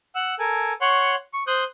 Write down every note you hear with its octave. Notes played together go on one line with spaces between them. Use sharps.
F#5 E6
A4 A#4 G#5
C#5 F#5 C6 C#6
C#6
C5 D#6 F#6 G6